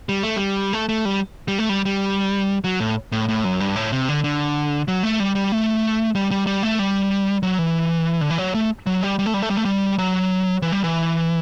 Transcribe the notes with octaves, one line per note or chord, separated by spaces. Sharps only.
G3
A3
G3
A3
A3
G3
G3
A3
G3
G3
F#3
A2
A2
A2
F#2
G2
A2
C3
D3
D3
F#3
A3
G3
G3
A3
G3
G3
G3
A3
G3
F#3
E3
D3
E3
F#3
A3
F#3
G3
G3
A3
G3
A3
G3
A3
G3
F#3
E3
G3
E3